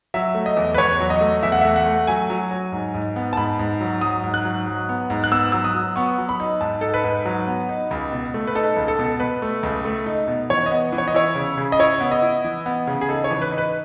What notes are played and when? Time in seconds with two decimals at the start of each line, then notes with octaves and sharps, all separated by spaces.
0.14 F#3 E5
0.35 A3
0.46 D#5
0.57 E2
0.74 B4
0.78 E2 C#5
1.00 F#3
1.10 D#5
1.21 A3
1.43 E2 E5
1.52 F#5
1.61 A3 E5
1.76 F#5
1.86 A3
2.07 F#3 G#5
2.30 F#3
2.51 F#3
2.72 G#2
2.94 G#2
3.16 B3
3.33 A5
3.37 G#2 B5
3.59 G#2
3.81 F#3
4.01 F#3 D#6
4.24 G#2
4.34 F#6
4.45 F#3
4.67 F#3
4.89 B3
5.10 G#2
5.24 F#6
5.32 B3 E6
5.52 F#3 E6
5.64 D#6
5.74 F#3
5.96 B3 C#6
6.18 F#3
6.29 B5
6.40 D#4
6.61 G#2 A5
6.81 D#4 A4
6.94 B4
7.04 G#2
7.25 F#3
7.47 B3
7.69 D#4
7.91 C#2
8.12 B2
8.34 A3
8.47 B4
8.55 D#4 A4
8.77 C#2
8.88 A4
8.99 B2
9.20 B2 B4
9.42 A3
9.63 C#2
9.85 A3
10.06 D#4
10.28 B2
10.50 E3 C#5
10.66 D#5
10.71 B3
10.92 E3
10.98 C#5
11.08 D#5
11.15 E4 C#5
11.36 C#3
11.58 C#3
11.72 D#5
11.79 E4 C#5
12.00 B3
12.12 D#5
12.22 E4
12.44 E3
12.66 B3
12.87 C#3
13.01 G#4
13.09 D#4 A4
13.24 C#5
13.31 E3
13.42 B4
13.51 D#4
13.58 B4